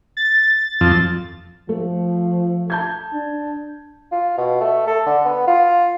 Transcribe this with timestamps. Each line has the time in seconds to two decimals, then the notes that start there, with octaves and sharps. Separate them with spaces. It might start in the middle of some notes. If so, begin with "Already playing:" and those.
0.17 A6
0.81 F2
1.69 F3 A3
2.70 A5 G6 G#6
3.13 D4
4.12 F4
4.38 B2
4.61 A3
4.87 A4
5.06 D3
5.25 B3
5.48 F4